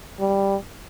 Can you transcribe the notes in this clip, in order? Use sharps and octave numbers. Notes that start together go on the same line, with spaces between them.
G3